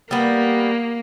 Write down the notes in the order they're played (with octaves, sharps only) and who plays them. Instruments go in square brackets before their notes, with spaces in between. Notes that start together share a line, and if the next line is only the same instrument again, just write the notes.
[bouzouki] G3 B3 [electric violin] A#3